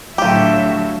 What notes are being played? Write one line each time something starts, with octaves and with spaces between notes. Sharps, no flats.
A2 D3 F#3 F4 G4 E5